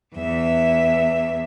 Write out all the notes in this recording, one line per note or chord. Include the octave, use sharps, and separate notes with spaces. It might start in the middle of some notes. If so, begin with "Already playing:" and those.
E2 E5